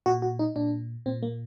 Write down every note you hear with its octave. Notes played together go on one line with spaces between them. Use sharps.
A#2 F#4
F#4
D#4
A#2 D4
A#2 C4
A#3